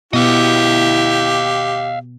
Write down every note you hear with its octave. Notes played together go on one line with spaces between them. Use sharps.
B2 B3 E4 G4 D#5 F5